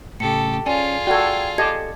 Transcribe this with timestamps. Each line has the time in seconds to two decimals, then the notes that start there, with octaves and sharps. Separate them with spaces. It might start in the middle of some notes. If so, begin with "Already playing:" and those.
0.20 A2 C#3 G4 A4 C#7
0.66 C#4 F4 G#4 D5 G#5
1.07 F#4 A4 D5 G5 G#6
1.58 G4 A4 D#5 A5 G#6